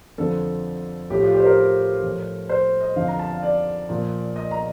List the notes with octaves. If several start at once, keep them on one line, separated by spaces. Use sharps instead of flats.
F2 D3 F3 A4
A2 F3 G4
F4
G4
C5
A#4
A2 F3
C5
D#5
F2 D3 F3 F5
A#5
A5
F5
D5
A#2 F3
D#5
A#5